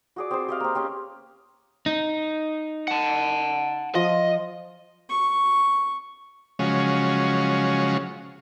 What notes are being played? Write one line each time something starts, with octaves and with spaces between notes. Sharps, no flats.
F#4 G#4 D5
C4 G#4 C5
G4 D#5 F5
A#3 C4
C4 C#4 G4
D#4
F#5 A5
F3 D#5
C#6
C#3 F3 F#3 G#3 C#4